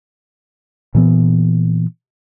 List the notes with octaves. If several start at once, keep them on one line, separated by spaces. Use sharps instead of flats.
A#2 E3 B3